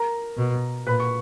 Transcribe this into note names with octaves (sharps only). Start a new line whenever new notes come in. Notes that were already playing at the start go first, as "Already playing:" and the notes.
Already playing: A#4 A#5
B2
A#2 B4 B5
C#6